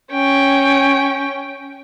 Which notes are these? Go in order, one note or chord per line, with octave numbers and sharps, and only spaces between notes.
C#4 G5